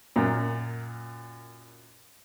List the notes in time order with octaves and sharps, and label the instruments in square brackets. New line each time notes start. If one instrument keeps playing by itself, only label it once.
[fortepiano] F#2 A#2